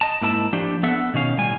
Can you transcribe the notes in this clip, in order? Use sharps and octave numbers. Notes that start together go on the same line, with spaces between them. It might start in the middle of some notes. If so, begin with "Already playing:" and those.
D#5 A5
G#2 A#3 E4 A5
F3 A3 D4 G4
B3 A4 E5 F#5
B2 D#3 C#4 F5
A2 G3 G#5